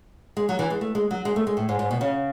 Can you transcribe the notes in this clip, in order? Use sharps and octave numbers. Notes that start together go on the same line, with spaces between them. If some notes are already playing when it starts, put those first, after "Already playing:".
G#3
F#3
E3
G#3
A3
G#3
F#3
G#3
A3
G#3
A2
G#2
G#2
B2
C#3